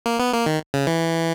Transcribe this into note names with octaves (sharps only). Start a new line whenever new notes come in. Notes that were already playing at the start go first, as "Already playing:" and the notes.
A#3
B3
A#3
D#3
C#3
E3